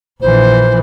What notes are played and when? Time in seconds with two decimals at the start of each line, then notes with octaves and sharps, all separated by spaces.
0.22 A#1 E3 C5